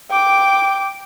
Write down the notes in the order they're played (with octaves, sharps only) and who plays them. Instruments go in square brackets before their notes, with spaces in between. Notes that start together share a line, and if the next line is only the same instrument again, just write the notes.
[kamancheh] G5 D6